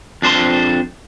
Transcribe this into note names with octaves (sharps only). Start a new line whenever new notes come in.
F2 D4 C5 A5 C6